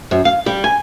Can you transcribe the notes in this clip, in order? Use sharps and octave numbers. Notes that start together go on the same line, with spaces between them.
F#2
F5
G3
G#5